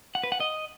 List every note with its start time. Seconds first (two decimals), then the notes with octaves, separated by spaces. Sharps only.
0.15 F#5
0.24 B4
0.32 F#5
0.40 D#5